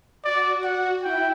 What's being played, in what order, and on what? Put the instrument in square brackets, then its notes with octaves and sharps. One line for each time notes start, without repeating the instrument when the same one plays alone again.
[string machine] F#4 [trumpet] D5
[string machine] F#4 [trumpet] F#5
[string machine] E4 [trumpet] G5